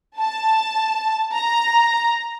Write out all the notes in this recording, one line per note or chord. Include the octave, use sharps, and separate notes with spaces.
A5
A#5